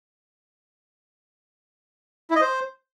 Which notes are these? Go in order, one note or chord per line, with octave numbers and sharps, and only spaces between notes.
E4
D#5
C5